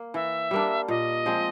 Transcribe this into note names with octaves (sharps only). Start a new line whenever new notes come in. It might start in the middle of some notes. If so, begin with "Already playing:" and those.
Already playing: A#3
E3 E5
G3 A#3 D4
A#2 D#5
F3 G#3 C4